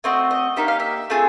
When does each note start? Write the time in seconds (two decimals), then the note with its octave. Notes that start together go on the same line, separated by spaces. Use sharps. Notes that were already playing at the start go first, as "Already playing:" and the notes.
0.04 A3 C4 F#4 D#5
0.31 D#5
0.56 A#3 D#4 G4 E5
0.68 F5
0.80 E5
1.10 A3 C4 F4 G#4